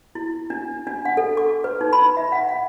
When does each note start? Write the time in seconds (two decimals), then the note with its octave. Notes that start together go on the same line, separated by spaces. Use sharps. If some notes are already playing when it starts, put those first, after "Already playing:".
0.15 E4
0.50 D4
0.87 D4
1.05 F#5
1.17 A4
1.37 D6
1.64 B4
1.81 D#4
1.93 B5
2.17 E5
2.32 F#5
2.49 F#5